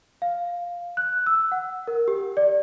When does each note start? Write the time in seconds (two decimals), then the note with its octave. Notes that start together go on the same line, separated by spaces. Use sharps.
0.22 F5
0.97 F#6
1.26 E6
1.52 F#5
1.88 A#4
2.08 G4
2.37 D5